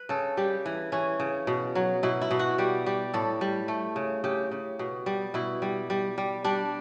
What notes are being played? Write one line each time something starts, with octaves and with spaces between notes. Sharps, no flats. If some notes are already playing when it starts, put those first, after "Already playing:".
Already playing: B4
C#3 A4
G3 G4
E3
E3 C#4
C#3
B2
F#3
B2 E4
E4
B2
F#4
G3 G4
G3 G4
A2 A4
G3
A3
C#3
C#3 G4
C#3
B2
G3
B2 E4
G3
G3
G3
G3 D4